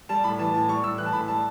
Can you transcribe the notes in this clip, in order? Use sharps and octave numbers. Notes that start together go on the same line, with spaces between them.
G3 A5
A2 B5
E3 A5
A2 A5
G3 C#6
A2 E6
E3 F#6
A5
A2 B5
G3 A5